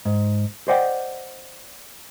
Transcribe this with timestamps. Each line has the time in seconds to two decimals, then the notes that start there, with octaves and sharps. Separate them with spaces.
0.05 G#2
0.68 C5 D5 D#5 F#5 G5